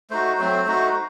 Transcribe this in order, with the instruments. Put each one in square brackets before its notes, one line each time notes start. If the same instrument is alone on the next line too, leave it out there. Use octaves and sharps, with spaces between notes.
[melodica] A3 D#4 F#4 C5
F#3 A3 C4
A3 D#4 F#4